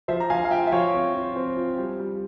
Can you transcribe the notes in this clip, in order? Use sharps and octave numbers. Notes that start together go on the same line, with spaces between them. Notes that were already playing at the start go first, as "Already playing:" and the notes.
F3 C5 E5
A#5
F3 F5 G#5
F5
F4 E5 G5
E5
F3 C#5 F5
C4
F4
C4
F4
G3
G3